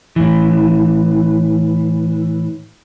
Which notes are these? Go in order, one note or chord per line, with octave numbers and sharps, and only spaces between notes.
A2 E3